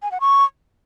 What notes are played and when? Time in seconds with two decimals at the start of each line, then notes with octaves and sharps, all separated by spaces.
0.03 G#5
0.12 F#5
0.21 C#6